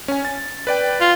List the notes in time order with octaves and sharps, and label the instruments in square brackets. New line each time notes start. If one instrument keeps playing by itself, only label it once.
[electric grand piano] C#4 G#5
A6
B4 D5 G5
[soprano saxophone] F4